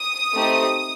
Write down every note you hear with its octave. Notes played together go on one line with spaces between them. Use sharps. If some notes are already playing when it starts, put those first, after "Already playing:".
Already playing: D#6
A3 C4 D#4 G4